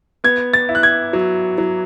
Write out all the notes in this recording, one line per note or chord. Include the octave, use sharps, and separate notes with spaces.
B3 G#6
A6
E4
F#6
G#6
F#3
F#3